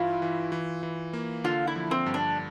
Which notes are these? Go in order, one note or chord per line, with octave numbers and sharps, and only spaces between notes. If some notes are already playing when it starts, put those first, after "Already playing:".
Already playing: G2 E3 E4 F4
E3
E3
E3
A#3
D3 F4
E4
F3
C4
G2
D4